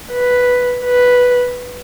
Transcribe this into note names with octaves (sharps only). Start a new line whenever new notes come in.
B4
B4